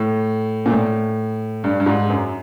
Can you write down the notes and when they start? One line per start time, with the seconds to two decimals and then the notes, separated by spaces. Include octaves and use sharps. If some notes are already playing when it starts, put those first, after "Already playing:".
Already playing: A2
0.66 A#2
0.71 A2
1.64 G2
1.80 G2
1.86 G#2
2.10 F#2